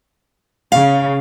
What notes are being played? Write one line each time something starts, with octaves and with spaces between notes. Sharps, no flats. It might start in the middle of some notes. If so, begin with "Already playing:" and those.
C#3 F5